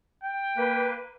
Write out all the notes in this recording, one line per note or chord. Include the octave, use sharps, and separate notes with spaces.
G5
A#3 B4